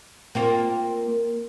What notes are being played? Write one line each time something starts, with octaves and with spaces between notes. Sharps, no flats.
A#3 C4 F4